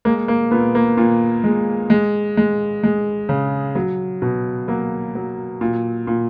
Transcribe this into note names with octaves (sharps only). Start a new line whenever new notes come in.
G#3 A#3
A#3
A#2 B3
A#3
A#2
G#3
G#3
G#3
G#3
C#3
F#3
B2
F#3 A#3
F#3
A#2
A#2